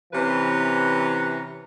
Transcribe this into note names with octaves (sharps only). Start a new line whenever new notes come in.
C3 E3 C#4 B4 A#5